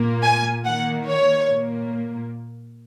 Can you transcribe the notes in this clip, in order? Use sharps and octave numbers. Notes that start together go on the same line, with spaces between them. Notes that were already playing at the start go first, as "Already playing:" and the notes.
Already playing: A#2 A#3
G#5
D#3 A#3 F#5
C#5
A#2 A#3